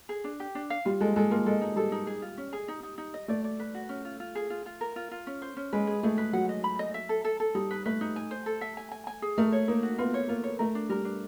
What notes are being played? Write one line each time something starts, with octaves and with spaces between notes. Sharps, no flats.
G#4
D4
G4
D4
F5
G3 F4
G#3 A4
G#3 A4
A#3 F4
G#3 A4
D#4
G3 A4
D#4
G#4
F4
C#4
G#4
D#4
D#4
D#4
D#5
A3 D5
D5
B4
F#4
C#4
F4
F4
G#4
F4
F4
A#4
F4
F4
C#4
C5
C#4
G#3 B4
G#4
A3 G#4
B4
F#3 F#5
D#5
B5
D#5
E5
A4
A4
A4
G3 D#4
B4
A3 B4
D#4
G#5
C5
A4
E5
G#5
G#5
G#5
G#4
A3 A#4
C#5
A#3 D#4
F#4
B3 F4
C#5
A#3 F4
C#5
A3 A#4
D4
G3 A#4
D4